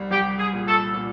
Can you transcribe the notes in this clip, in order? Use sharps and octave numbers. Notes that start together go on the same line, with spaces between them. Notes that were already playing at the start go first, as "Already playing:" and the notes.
Already playing: C2 G3
C2 G4
G#4
A#2
A4
A#2